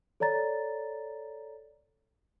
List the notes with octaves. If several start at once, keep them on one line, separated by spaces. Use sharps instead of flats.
A4 C#5 D5 A#5 A6